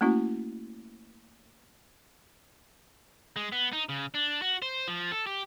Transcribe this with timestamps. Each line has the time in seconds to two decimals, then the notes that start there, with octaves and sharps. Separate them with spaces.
0.01 A3 A#3 C#4 E4 F#4
3.36 G#3
3.52 B3
3.73 D#4
3.89 C#3
4.14 D4
4.42 F#4
4.62 C5
4.88 F3
5.11 A4
5.27 G4